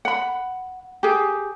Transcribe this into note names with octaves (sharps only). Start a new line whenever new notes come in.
F#5 B5
G4 G#4